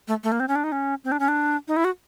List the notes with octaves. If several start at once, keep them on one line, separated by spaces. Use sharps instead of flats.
A3
A3
A#3
C4
C#4
D4
D#4
C#4
C4
D4
C#4
D4
D#4
E4
F#4